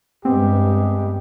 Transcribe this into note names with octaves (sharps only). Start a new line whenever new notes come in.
G2 G#3 B3 C4 G4